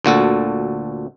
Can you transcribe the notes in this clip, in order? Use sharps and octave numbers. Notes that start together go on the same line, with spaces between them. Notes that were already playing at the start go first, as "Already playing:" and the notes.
D2 A#2 F#4 A4